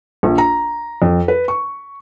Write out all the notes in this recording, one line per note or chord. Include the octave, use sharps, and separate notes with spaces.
A#1
A#5
F2
B4
C#6